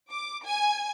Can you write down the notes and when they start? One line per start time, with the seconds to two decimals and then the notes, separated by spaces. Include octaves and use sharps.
0.11 D6
0.44 G#5